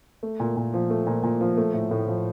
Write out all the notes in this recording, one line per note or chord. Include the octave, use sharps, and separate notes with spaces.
A3
A#2
A#2
F3
A3
A#2
A#2
F3
A3
A2
A2
F3